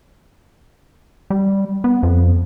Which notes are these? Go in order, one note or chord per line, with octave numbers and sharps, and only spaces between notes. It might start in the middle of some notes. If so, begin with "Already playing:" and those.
G3
B3
F2